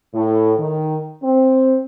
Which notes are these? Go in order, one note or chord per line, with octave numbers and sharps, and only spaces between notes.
A2
D#3
C4